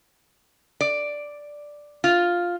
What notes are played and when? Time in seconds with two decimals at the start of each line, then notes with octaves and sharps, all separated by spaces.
0.81 D5
2.04 F4